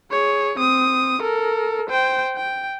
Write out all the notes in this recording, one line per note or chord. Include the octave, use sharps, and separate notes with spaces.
G#4 C#5
C4 D#6
A4 A#4
C5 G5
G5